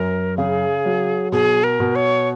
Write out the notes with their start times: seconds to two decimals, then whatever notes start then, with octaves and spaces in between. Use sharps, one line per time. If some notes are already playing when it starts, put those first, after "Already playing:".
Already playing: F#2 A#4
0.37 C#3 G#4
0.85 F#3
1.32 B2 G#4
1.64 A#4
1.80 B2
1.95 C#5